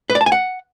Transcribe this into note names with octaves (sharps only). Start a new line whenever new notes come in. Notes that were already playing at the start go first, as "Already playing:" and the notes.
B4
D5
A5
G#5
F#5